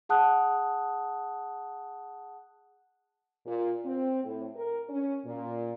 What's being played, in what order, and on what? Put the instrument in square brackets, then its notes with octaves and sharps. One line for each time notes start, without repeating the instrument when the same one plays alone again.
[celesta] G#4 F#5 A5 D#6 F#6
[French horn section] A#2
C4
A2
A#4
C#4
A#2